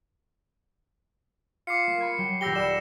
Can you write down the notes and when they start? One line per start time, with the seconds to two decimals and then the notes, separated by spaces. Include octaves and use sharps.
1.67 F4 D6 C7 C#7
1.87 A#3
2.00 B5 G#6
2.18 F#3 G5
2.41 D#1 G4 E6 G6 A#6 G7
2.55 G3 E7